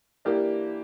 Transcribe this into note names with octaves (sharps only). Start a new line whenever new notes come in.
E3 A#3 D4 G4